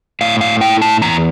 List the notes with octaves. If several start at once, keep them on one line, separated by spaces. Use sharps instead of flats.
A2 F5
F5
E4 G5
A5
E2 A#5